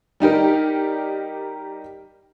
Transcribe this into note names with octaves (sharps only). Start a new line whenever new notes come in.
G3 D#4 G4 A#4